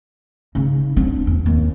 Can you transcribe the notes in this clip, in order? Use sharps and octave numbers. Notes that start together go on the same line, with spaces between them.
C#3 D#4
C4 D4
E2
D#2